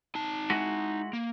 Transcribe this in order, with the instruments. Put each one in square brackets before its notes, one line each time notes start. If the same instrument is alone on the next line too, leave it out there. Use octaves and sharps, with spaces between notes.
[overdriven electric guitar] D#4 A5
[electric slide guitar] G#3 E4 F#4
[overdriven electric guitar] A#3